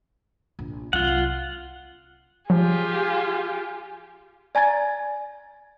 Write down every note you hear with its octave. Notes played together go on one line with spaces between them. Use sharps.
A#1
C2 F#3 F4 F#5
F3 F4 G4 G#4
D5 G#5 A#5 G#6 A6